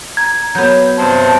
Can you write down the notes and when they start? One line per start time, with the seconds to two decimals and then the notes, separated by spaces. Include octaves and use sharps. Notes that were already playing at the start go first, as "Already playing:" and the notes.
0.17 A#5 G#6
0.55 F#3 B3 G6
0.97 G2 C3 C4 A5